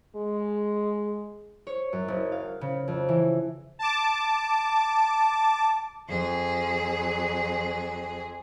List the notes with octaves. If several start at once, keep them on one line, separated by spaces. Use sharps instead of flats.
G#3
C#5
F#2
F#1
F5
C#3
F2
E3
A5 D6
F2 G#4